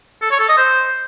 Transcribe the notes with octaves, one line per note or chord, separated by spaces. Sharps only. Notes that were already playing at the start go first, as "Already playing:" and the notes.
A4
C#5
A4
D#5
C5